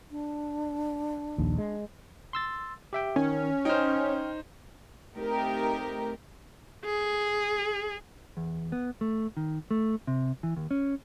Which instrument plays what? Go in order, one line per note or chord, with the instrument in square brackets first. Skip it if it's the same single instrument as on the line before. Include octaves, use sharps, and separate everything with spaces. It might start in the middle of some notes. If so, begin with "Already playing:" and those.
[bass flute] D4
[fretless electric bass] A#1 D#2
G#3
[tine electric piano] C6 E6 A6
G4 E5 G5
[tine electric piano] D#3 [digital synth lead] C#4
[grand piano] D#4 C5 [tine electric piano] G5 F6
[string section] A3 C4 D#4 G4 A#4
[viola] G#4
[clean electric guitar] E2
B3
A3
D#3
A3
C3
E3
D#2
C#4